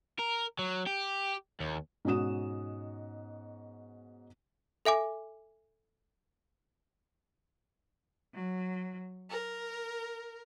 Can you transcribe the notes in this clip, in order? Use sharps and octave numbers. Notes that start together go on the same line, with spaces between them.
A#4
F#3
G4
D#2
G#2 B2 C#4 F#4 D#6 E7
A4 E5 G#5 D6
F#3
A#4